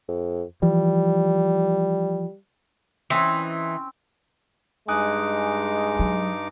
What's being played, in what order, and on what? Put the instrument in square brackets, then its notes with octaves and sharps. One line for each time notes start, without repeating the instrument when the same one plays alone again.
[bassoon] F2
[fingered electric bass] E3 F3 [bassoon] G3
[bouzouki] E3 D#4 [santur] C4 C#4
[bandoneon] G2 D#4 D6 [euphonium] G#3 [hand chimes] G#5 D#6 F#6
[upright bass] F#3